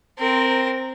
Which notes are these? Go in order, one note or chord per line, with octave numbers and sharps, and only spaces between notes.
C4 A#4